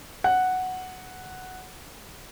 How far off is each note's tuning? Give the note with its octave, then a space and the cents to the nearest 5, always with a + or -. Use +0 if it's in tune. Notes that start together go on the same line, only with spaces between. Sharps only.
F#5 +0